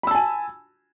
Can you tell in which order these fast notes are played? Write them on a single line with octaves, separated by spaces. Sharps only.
B5 E6 A5 G#5